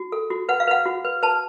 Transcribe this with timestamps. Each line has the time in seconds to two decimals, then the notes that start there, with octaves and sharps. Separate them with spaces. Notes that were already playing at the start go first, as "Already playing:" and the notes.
Already playing: F#4
0.12 A4
0.30 F#4
0.49 B4 F#5
0.60 F5
0.67 B4 F#5
0.85 F#4
1.05 B4
1.23 B4 A5